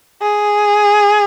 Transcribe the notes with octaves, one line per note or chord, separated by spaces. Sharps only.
G#4